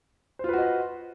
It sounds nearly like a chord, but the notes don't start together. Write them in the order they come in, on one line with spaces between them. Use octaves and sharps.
C5 F4 B4 F#4 D#5